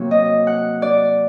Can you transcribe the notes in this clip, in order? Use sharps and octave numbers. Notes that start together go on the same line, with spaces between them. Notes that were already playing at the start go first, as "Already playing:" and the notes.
Already playing: C3 F#3 A#3
D#5
F#5
D5